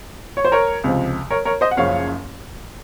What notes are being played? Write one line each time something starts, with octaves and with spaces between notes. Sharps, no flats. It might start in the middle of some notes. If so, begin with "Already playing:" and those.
C#5
C5
A#4 C#5
C#2 C3 F3
A#4 C#5
A#4 C#5
C5 D#5
F#5
F#1 F#2 C#3 F3 C#5 F5